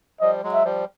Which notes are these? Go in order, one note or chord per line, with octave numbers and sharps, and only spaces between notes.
F3 G3 D#5
F#3 G#3
E5
F3 G3